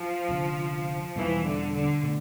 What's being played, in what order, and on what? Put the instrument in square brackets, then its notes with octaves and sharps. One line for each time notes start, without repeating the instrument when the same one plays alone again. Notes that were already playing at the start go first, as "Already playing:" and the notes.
Already playing: [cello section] F3
[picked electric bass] F1 F2 D3
[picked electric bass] E2 B2 G3 C4 [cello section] E3
[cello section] D3
D3
[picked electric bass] B2 A3